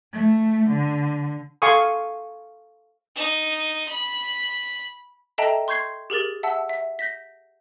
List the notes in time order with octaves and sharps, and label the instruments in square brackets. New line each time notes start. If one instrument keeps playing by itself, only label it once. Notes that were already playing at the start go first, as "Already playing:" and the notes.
[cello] A3
D3
[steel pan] A4 F5 G#5 C6 C#6 D#6
[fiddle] D#4
B5
[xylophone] A4 D#5 E5 G5 A5 A#5
C6 C#6 G6 G#6 C7
G4 G#4 A#4 A6
E5 F#5 A5 E6
E5
G6 A#6 B6